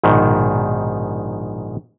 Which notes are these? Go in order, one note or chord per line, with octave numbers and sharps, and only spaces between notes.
A#1 G#2 B2 D#3